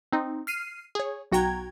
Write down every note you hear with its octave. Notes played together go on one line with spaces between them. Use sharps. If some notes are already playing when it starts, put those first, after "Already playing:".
C4 D#4
F6 C7 D#7
G#4 C#5
B1 F#4 G5 A#5 G#6